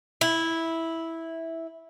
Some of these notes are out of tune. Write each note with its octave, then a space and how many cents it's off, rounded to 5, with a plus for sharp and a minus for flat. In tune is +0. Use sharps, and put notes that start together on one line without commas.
E4 -10